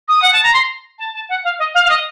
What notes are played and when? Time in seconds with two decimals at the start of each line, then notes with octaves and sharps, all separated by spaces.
0.08 D#6
0.22 F#5
0.33 A5
0.43 A#5
0.54 C6
0.99 A5
1.14 A5
1.29 F#5
1.44 F5
1.59 D#5
1.75 F5
1.85 F5
1.90 D#5